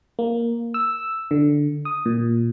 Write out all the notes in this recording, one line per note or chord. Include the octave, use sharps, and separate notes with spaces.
A#3
E6
D3
D#6
A#2